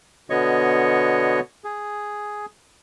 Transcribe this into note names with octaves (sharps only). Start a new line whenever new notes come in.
B2 D3 B3 C#5 D#5 C#6
G#4